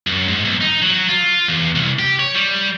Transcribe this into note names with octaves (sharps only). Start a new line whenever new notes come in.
F#2
G#2
B1
D#4
F#3
F4
E2
C2
G4
C#5
G3